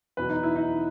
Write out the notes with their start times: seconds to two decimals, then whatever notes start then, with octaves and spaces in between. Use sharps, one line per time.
0.17 E2 B2 F#3 B4
0.30 D#4
0.43 E4
0.56 D#4